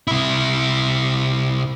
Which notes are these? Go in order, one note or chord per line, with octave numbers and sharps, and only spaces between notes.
C3 E4